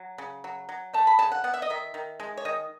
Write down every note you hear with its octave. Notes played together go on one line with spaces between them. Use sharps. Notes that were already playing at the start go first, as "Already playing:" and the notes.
Already playing: F#3
C#3
F#3
F#3
A3 A5
B5
C#3 A5
F#5
B3 F#5
E5
D#5
D#3 E5
D#3
G#3
C#5
D#3 D#5